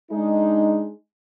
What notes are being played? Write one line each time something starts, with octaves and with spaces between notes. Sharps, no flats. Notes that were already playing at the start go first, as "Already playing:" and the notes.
G#3 D4 D#4